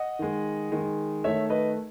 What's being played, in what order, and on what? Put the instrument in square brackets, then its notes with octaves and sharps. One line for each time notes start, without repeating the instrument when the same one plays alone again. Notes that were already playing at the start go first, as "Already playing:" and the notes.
Already playing: [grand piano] D#5 F#5
D#3 G#3
D#3 G#3
D#3 A3 C#5 E5
B4 D#5